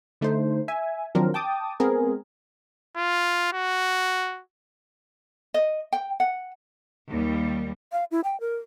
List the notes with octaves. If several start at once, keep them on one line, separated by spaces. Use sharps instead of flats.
D3 A3 D#4 C5
E5 G#5
D#3 F3 F#3 C4 D4 A#4
G5 A5 D6 D#6
G#3 B3 C4 G#4 A#4
F4
F#4
D#5
G5
F#5
D#2 G3
F5
E4
G5
A#4